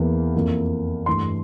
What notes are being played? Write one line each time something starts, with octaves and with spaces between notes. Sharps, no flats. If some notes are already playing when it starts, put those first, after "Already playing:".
Already playing: E2 E3 A#3
F2 E3 A#3
G2 E3 A3 C6